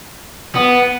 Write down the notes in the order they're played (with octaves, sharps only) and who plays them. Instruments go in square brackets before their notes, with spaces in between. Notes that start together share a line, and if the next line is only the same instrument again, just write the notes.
[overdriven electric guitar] B3